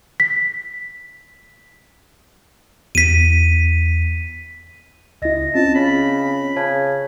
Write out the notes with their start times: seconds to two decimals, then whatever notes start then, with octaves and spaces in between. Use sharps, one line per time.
0.20 B6
2.95 E2 B6 D#7
5.22 C#2 E4 D#5 A#6
5.55 C4 C#4 F4 A5
5.75 C#3 B5
6.56 C#3 A5 G#6